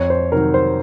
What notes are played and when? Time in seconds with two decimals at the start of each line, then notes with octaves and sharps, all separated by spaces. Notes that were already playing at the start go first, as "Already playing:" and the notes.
Already playing: F2 C#5
0.10 C5
0.32 C3 D#3 F#3 A#4
0.54 C5